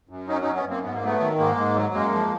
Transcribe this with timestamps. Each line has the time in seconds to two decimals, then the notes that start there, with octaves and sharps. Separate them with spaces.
0.09 F#2
0.28 F#3 C#4 D#4
0.42 F#2 C#4 D#4
0.55 B3 C#4
0.65 F#2 A#3 C4
0.83 G#2 B3
0.94 A#3
1.02 F#3 A3 B3
1.20 D#3
1.38 G#2 G#3 A#3
1.57 G#2
1.76 F#3
1.94 F#2 G#3 A#3
2.13 F3